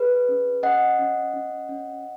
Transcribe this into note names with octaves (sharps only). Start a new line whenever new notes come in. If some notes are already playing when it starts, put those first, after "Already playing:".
Already playing: G#4 B4
C#4
C#4 D#5 F#5
C#4
C#4
C#4